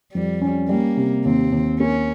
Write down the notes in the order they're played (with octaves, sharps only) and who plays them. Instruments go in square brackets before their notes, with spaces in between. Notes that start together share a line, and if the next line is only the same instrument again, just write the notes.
[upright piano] F2 [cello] G3
[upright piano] C#4
[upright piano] G3 [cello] A#3
[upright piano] C3
[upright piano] D#2 [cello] C4
[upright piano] D#2
[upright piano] A#3 [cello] C#4